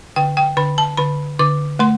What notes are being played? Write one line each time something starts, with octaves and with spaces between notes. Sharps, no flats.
D3 G5
G5
D3 B5
A5
D3 B5
D3 D6
A3 C6